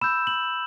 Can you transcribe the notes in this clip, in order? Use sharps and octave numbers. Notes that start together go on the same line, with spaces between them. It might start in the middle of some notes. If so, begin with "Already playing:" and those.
B5 E6 G6 E7
F#7